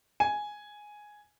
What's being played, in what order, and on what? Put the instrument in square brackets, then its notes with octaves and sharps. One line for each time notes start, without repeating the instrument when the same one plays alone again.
[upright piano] G#5